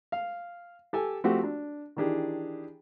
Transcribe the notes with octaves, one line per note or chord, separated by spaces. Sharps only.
F5
G4 A4 G#5
F3 A3 C4 F#4 G4
D4
D#3 E3 D4 G4 G#4